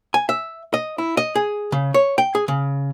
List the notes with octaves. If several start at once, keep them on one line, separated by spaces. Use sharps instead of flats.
G#5
E5
D#5
E4
D#5
G#4
C#3
C#5
G5
G#4
C#3